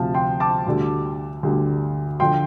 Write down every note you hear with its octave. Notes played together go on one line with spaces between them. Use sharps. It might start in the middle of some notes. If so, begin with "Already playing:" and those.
Already playing: D2 C3 F3 F5 A5
G5 C6
A5 D6
D2 D3 G3
D2 D3 G3
D3 F3 G5 C6